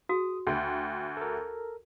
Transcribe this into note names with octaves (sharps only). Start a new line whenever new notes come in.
F#4 G#4 D#6
D2 G5 C6
A4 A#4